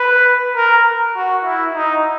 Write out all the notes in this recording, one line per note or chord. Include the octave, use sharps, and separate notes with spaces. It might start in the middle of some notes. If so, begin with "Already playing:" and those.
Already playing: B4
A#4
F#4
E4
D#4